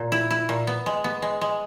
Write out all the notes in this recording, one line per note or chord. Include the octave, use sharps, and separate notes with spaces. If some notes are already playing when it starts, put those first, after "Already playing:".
Already playing: A#2
E4
E4
A#2
B3
G#3
B3
G#3
G#3